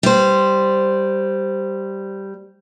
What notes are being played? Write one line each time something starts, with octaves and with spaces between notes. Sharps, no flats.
G3 C5